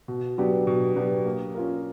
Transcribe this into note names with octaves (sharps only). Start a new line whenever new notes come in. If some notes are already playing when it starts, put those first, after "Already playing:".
B2
F#3 B3 D4 G4
B2
F#3 B3 D4 G4
A#3
C#4 F4 A#4